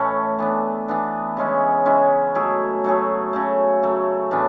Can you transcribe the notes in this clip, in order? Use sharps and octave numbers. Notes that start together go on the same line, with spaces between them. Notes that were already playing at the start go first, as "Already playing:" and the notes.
Already playing: A2 E3 A3 C#4
E3 B3 D4
E3 B3 D4
C#3 G#3 C#4 E4
C#3 G#3 C#4 E4
F#3 A3 E4 G#4
F#3 A3 E4 G#4
C#3 F#3 A3
C#3 F#3 A3
A2 E3 B3 D4